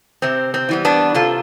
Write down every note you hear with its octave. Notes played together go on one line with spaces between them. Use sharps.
C3 C4
C4
E3 G3 B3
B3 D4
C3 F4 A4